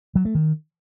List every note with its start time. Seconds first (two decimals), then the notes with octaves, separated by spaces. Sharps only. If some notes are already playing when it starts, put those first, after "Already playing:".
0.15 F#3
0.25 A3
0.35 D#3